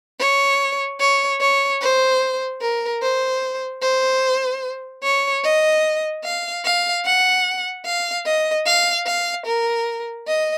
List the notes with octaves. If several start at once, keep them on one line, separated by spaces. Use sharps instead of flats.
C#5
C#5
C#5
C5
A#4
C5
C5
C#5
D#5
F5
F5
F#5
F5
D#5
F5
F5
A#4
D#5